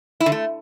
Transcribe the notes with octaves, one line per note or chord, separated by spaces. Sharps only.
E4
D3
A3